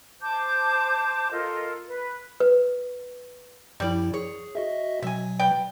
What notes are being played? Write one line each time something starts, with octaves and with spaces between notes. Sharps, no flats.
C5 A5 D6 G6
F4 A4 A#4 D#5
B4
B4
F#2 F3 G3 E4 D5
G#4 C#5
F#4 D#5 E5
B2 F#3 E5 G#5
B4 D5 G5